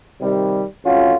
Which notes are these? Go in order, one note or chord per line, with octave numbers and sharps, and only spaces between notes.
C3 D#3 G3
A1 F2 C#4 F4 F#4